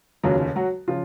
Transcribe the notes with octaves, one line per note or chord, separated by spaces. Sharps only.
F1 D#2 C#3 F3 F#3 F#4
F#3 F#4
C#3 F3 F4